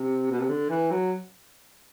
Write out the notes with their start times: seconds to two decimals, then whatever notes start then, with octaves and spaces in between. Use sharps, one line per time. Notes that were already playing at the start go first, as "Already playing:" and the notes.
Already playing: C3
0.31 B2
0.40 C3
0.49 D3
0.69 E3
0.91 F#3